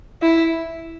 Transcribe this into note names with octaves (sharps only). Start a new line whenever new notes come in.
E4